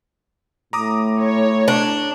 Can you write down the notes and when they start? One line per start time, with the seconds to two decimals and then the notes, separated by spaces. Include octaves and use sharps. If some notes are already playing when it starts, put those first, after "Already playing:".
0.73 A2 A#5 D6 D#6
1.20 C#5
1.68 D4